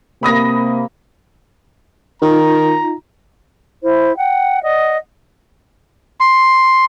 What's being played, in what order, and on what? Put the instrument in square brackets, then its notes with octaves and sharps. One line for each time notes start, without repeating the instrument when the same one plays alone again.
[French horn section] C3 A#3 [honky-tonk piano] B5 D#6 A#6
[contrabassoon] D#3 [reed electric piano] D#4 F4 [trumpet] A#5
[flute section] E4 C5
F#5 G5
D5 D#5 F#5
[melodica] C6